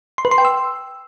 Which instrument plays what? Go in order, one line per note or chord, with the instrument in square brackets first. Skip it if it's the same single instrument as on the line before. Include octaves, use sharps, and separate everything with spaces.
[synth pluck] C6
B4
C6
G5
E6